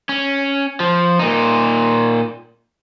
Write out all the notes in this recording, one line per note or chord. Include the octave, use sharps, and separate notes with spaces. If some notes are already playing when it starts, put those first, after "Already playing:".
C#4
F3
A#2 D#4